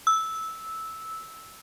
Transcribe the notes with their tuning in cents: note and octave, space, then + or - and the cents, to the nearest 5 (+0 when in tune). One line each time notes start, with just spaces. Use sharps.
E6 -10